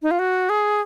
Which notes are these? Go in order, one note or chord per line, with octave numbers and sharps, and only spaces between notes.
D#4
F4
F#4
G#4